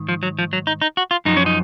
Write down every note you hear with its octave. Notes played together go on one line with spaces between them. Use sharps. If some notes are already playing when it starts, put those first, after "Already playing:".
Already playing: G#2 D#3
F3
F#3
F3
F#3
D#4
D#4
F#4
F4
F#2 F3 D#4
C#4
D#4